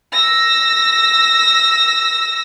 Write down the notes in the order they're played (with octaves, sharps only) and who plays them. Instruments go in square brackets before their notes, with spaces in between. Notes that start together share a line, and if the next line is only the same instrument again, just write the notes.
[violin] E6 A#6